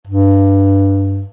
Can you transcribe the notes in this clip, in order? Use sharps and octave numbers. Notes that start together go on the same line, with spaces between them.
G2